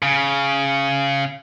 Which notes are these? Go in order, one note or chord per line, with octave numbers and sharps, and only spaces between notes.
C#3